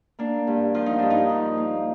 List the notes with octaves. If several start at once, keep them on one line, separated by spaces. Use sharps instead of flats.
A#3 D4
G2
F3 F4
D#4
G2 D4
D#4
F3
A#3